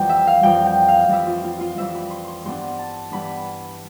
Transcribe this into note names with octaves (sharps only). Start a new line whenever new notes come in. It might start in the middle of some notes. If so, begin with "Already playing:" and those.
Already playing: F2 E3 G3 G5
E5
F5
F2 E3 G3 G5
G5
F5
F2 E3 G3 E5
F4
F4
F4
F2 E3 G3 E5
B5
C6
C6
G2 E3 B3 D4 C6
A5
G2 E3 B3 D4 B5